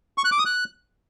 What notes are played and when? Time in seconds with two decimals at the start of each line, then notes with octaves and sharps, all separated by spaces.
0.18 C#6
0.25 F#6
0.32 D6
0.39 D#6
0.46 F#6